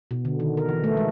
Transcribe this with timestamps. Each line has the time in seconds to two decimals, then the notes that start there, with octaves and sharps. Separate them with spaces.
0.11 B2
0.25 D3
0.40 D#3
0.57 A#4
0.69 E3
0.84 A3
0.97 G#3